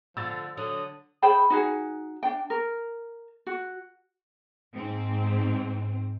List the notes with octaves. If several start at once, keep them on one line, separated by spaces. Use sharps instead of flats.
D3 F3 E6 A6
D3 F#3 D#6
G#4 C5 G5 B5
D#4 F#4 G#4
D4 G5
A#4
F#4
G#2 C4